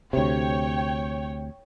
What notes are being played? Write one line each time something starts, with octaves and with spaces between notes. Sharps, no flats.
D2 C3 C#5 G5